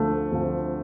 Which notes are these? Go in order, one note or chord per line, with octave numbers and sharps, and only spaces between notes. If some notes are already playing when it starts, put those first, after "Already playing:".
Already playing: D2 D3 F3 A3
D2 D3 F3